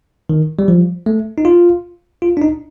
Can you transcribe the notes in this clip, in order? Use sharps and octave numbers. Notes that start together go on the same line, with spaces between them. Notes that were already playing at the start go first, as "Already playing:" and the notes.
D#3
G3
F3
A3
D#4
F4
F4
D4
D#4